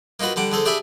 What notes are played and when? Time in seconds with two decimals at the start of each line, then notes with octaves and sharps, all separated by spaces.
0.20 A#3 D#4 F4 F#4 B4
0.36 D3 G3 F#5 D6
0.52 D3 G#4 A4 C5
0.66 D4 G4 G#4 E5 G#5 B5